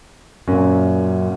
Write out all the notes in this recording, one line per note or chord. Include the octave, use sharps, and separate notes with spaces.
F#2 A#2 C#4